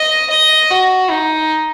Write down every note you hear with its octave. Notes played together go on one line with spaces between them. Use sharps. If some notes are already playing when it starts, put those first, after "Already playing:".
Already playing: D#5
D#5
F#4
D#4